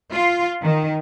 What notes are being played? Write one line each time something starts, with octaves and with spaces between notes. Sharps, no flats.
F4
D#3